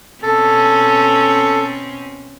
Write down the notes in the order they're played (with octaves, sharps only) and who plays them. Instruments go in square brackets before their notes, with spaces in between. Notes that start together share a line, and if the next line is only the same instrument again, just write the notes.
[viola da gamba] B2 C4 C#4 [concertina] A4